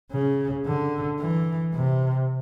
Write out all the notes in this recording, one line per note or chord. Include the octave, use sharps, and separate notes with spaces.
C#3
D3
E3
C3